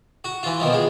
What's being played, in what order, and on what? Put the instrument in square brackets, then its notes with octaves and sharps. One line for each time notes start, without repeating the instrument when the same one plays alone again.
[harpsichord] F#4
E3 F4
B2 D#3 F3
G#3